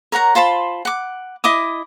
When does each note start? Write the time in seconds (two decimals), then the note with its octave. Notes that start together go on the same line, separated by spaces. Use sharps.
0.12 A#4 C#5 F#5 A#5
0.35 F4 C5 A5 B5
0.85 F#5 D6
1.44 E4 D#5 D6 D#6